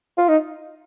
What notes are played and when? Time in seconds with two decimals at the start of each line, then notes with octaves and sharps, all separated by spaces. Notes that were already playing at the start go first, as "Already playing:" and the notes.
0.18 F4
0.29 D#4